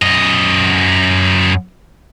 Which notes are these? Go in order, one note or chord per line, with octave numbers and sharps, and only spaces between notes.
F#2 D#5